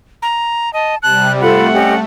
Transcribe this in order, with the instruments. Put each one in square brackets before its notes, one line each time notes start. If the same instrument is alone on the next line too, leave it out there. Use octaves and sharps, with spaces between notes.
[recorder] A#5
[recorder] D#5 [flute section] A5
[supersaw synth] C3 G3 [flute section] A5 [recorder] F#6
[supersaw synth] A3 [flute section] F4 A4 B5 [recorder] F#5
[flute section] C#4 G4 D#5